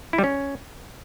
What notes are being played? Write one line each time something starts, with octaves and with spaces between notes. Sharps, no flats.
E4
G3
C#4